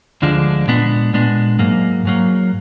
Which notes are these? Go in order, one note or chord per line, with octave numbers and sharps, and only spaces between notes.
D2 D3 F3 G#3 D4
A#2 G#3 B3 D4
A#2 G#3 B3 D4
G#2 F#3 A#3
G#2 F#3 A#3